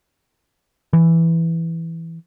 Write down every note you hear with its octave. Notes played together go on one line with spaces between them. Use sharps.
E3